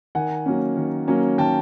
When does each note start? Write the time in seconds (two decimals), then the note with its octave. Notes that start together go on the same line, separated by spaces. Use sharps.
0.15 D#3 F#5 G#5
0.46 F#3 A#3 C#4
0.77 D#3
1.08 F#3 A#3 C#4
1.38 D#3 G5 A5